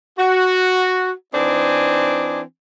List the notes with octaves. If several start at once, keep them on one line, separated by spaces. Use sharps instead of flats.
F#4
E3 C4 D4 D#4 G#5